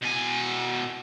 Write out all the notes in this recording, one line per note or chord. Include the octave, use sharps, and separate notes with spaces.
B2 G#5